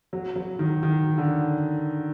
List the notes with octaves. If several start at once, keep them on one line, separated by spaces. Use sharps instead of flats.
F#3
F#3
D#3
D#3
D3